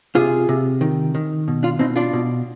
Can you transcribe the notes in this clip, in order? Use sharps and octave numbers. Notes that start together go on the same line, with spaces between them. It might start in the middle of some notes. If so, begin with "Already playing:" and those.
C3 F4 G#4
C3
D#3
D#3
B2
D4 F4
B2 C4 D#4
D4 F4
B2